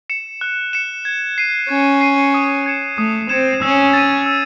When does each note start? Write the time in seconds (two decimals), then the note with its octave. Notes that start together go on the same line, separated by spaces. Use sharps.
0.10 C#7 E7
0.41 F#6
0.73 C#7 E7
1.05 G#6
1.38 C7 D#7
1.69 C#4 G#6
2.01 C7 D#7
2.34 D#6
2.66 G#6 C#7 E7
2.98 A3 D#6
3.29 C4 G#6 C#7 E7
3.62 C#4 E6
3.93 A6 D#7
4.26 E6